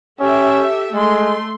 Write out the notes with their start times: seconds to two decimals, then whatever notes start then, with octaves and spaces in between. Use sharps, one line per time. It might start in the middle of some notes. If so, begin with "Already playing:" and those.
0.20 C#4 G4 A4 E5
0.94 G#3 A3 C6